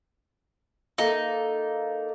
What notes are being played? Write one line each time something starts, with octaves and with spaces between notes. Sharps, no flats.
A#3 D#4 A4